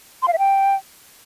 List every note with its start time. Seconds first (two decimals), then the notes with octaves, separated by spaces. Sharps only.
0.22 C6
0.28 F5
0.33 E5
0.39 G5